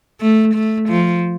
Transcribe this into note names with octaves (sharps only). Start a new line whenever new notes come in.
A3
A3
F3